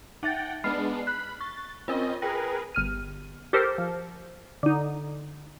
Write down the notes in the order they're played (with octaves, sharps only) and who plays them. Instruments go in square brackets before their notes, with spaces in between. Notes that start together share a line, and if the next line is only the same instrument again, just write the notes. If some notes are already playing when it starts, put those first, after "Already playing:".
[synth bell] D#4 E5 A6 [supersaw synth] F#5 G5
[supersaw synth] G#3 B3 D4 [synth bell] B5 F6 C7
[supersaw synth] B5 [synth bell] F#6
[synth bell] C#6 [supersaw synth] A6
[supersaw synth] C4 C#4 D#5 [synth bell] F4 A#4
[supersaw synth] G#4 A#4 B4 [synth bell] G5 A#6
[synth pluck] G1 F6 D#7
G4 A4 A#4 C5
F3
D3 D#4